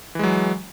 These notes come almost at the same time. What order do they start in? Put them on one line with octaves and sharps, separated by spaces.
E3 G#3 F#3